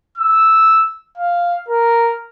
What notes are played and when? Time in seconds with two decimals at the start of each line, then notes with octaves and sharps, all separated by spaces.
0.18 E6
1.18 F5
1.68 A#4